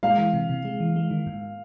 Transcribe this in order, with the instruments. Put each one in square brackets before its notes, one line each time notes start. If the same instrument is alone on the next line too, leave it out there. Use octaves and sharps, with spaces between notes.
[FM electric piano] G#3 [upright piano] F5
[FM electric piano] E3
C3
C3
G#3
E3
G#3
D#3
G#2